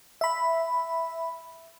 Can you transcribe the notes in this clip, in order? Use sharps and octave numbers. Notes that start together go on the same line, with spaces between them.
E5 B5